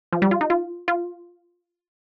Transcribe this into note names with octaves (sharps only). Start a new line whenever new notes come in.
F3
G3
F4
D#4
F4
F4